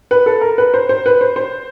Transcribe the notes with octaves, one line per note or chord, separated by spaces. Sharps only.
B4
A4
A#4
B4
C5
C5
B4
C5
C5